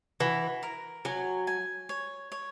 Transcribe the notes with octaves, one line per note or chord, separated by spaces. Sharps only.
E3 F#4
A#4
F#3 G#5
G#5
C#5
C#5